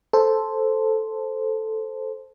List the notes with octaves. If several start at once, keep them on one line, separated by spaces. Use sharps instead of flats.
A4 C5